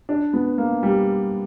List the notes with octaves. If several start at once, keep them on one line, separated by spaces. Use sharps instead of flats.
D4
B3
A#3
G3